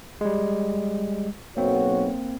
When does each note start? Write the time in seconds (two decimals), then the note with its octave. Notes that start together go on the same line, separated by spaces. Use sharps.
0.21 G3 G#3
1.57 B1 A#3 C4 F#4 C#5